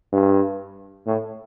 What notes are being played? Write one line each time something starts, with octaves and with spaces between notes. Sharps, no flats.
G2
A2